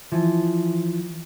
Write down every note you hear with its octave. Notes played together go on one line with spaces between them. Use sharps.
E3 F3